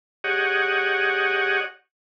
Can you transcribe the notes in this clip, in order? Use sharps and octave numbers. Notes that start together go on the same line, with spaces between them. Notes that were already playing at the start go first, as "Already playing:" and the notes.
G4 G#4 C#5 D#5 F#5